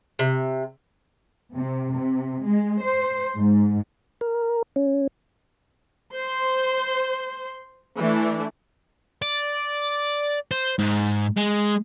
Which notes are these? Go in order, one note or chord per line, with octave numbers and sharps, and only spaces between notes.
C3
C3
C3
G#3
C5
G#2
A#4
C#4
C5 C6
E3 A3 D4
D5
C5
G#2
G#3